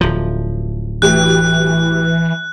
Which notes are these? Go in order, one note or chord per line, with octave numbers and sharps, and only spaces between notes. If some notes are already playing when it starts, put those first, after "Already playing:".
D1 F3
E3 F#3 A3 G4 F#6